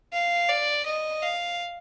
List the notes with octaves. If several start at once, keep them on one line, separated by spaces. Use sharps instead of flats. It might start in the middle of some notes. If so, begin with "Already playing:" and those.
F5
D5
D#5
F5